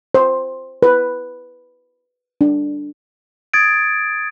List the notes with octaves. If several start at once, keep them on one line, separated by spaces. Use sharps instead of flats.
C5
B4
D4
D#6 G#6 A6 D7